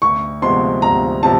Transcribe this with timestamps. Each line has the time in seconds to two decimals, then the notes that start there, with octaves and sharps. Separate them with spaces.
0.02 D2 C#6
0.42 C3 F3 G#3 B3 C6
0.82 D2 A#5
1.23 C3 F3 A5